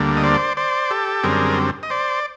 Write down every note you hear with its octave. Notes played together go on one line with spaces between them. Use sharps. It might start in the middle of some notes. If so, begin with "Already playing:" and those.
Already playing: D2 D3 G3 A#3
D#5
C5 D5
C5 D5
G4 A4
F#2 D3 G3 C4 G#4 A#4
D#5
C5 D5